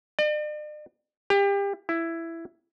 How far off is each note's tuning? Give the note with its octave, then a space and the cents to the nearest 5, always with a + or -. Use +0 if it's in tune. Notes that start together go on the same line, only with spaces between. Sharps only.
D5 +45
G4 +30
E4 +10